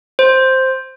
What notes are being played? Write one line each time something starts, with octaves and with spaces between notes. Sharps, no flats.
C5